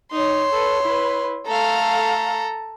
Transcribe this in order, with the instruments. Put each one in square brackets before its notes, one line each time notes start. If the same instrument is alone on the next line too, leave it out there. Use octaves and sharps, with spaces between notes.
[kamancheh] D#4 [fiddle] C#5 C6
[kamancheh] A4 B4
E4 B4
[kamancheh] A3 F5 [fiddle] A4 A#5